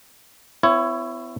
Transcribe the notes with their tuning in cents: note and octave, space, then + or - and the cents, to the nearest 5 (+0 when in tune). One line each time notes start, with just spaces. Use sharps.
B3 +45 E4 +20 C#5 +0